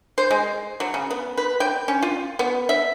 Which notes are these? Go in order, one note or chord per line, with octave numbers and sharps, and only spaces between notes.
C5
G#3
F#3
C#3
B3
B4
G5
C#4
F4
B3
E5